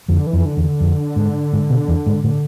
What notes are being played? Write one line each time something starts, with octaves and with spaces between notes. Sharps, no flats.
F2 D3
E3
F2
D3
E2
D3
F2
G#2
G#2
B2
E2
G#2
A2 D3